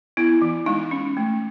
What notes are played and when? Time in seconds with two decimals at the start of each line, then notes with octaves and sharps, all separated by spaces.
0.17 B3 E4
0.42 E3
0.66 G#3 D#4
0.91 C#4
1.17 A3